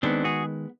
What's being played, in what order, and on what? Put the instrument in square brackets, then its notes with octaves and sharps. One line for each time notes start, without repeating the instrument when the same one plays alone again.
[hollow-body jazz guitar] D#3 G#3 B3 [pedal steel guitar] C4 D4
[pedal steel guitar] F#4 G#4